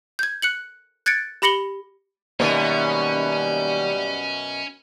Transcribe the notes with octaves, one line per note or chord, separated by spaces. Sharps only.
G6 G#6
F#6 C#7 F#7
F#6 G#6 A6 C#7 D7
G4 B5 A#6 C#7 F#7 G7
F#2 B2 D#3 G3 A#3 B3 C#4 G#5